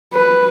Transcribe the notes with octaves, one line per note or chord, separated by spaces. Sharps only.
B4